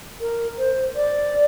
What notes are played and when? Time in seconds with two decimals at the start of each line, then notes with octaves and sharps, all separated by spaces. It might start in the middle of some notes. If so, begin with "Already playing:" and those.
0.21 A#4
0.59 C5
0.96 D5